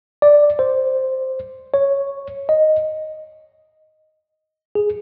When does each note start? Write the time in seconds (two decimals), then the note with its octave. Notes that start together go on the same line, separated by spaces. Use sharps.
0.22 D5
0.59 C5
1.74 C#5
2.49 D#5
4.75 G#4